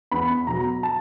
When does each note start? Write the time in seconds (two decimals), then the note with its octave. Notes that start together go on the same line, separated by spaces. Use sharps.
0.12 E2 B5
0.47 B2 F#3 A#5
0.83 A5